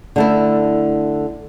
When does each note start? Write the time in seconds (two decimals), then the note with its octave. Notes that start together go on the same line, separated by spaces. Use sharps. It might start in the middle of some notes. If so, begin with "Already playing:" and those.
0.16 D3 A3 E4